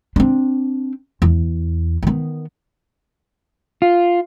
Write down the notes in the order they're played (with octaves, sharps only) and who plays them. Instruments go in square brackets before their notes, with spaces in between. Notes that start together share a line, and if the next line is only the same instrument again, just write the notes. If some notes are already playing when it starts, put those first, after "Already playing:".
[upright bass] C4 D4
E2
D#3 B3
[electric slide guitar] F4